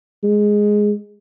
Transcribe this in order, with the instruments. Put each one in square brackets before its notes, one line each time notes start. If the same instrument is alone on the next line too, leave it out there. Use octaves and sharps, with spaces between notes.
[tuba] G#3